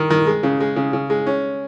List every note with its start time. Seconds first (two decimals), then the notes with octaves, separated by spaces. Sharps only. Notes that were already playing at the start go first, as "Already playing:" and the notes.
Already playing: D#3 A#4
0.10 D#3
0.27 G#3
0.43 C#3
0.60 G#3
0.76 C#3
0.93 C#3
1.10 G#3
1.27 C#4